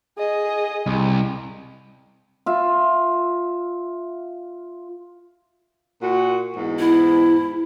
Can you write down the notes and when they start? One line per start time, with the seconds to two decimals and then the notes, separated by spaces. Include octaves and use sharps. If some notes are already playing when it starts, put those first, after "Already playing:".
0.18 G#4 D#5
0.86 C2
2.46 F4 E5
6.02 A#2 F#4
6.56 E2 G#2
6.79 E4